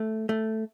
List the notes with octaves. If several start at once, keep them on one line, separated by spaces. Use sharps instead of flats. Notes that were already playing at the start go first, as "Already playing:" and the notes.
Already playing: A3
A3